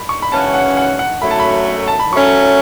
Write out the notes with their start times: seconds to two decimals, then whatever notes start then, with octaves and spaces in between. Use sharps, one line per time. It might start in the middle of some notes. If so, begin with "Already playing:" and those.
Already playing: B5
0.09 C#6
0.22 B5
0.32 C#3 E3 C#4 F#4 A5
0.54 F#5
0.77 F#5
0.99 F#5
1.22 F#2 F#3 A3 B5
1.31 A5
1.40 B5
1.88 A5
2.00 B5
2.12 F#3 A3 C#4 C#6